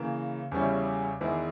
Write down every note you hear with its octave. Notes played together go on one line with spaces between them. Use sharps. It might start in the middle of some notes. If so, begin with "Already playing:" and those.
Already playing: C#3 E3 A#3
E2 C#3 G3 C#4 E4
E2 D#3 G#3 B3 E4